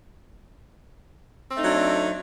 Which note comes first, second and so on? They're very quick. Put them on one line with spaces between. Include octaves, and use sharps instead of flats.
C4 A3 D#4 F#3 D4